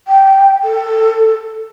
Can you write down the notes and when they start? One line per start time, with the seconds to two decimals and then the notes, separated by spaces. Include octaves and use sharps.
0.07 G5
0.64 A4